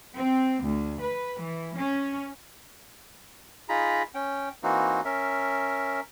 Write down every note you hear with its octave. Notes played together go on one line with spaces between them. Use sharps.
C4
D2
B4
E3
C#4
D#4 F4 G#4 A#5 B5
C#4 G5
E3 A#3 C4 D#4 F#4
C#4 A#4 E5